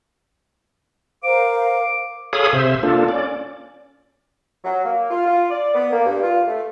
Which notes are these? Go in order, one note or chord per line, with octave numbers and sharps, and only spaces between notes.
A#4 C5 F5 D6
G#4 A4 C#5 F5 B5 D#6
C3 C5 E5
A#3 D4 F4 A4
C#4 D5
F#3
A#3
F4
F4
D5
B3
A#3
G2
F4
A3